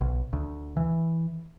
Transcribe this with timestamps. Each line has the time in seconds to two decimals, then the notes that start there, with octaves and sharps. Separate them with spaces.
0.01 B1
0.33 D2
0.77 E3